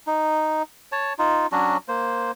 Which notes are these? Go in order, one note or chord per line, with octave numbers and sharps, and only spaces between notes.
D#4
C#5 A5
D#4 F4
F#3 C#4 D4 F#4
A#3 C5